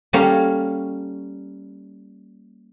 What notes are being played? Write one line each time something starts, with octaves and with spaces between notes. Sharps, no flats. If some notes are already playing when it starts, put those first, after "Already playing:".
G3 A#3 C#4 A4 C#5